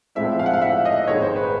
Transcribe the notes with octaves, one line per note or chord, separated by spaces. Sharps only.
A2 F3 G#3 C4 E4 E5
F5
F#5
F5
E5
D#5
G#1 G#2 D#3 G#3 C#5
C5
B4